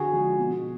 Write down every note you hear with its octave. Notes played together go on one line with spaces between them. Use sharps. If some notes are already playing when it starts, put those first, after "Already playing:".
Already playing: D3 F#4 G#4
F3 G#3
B2